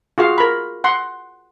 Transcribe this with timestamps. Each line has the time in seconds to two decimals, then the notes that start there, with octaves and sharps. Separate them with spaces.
0.18 F4 F#4 G#4 F5
0.38 A#4 B5
0.84 F#5 C6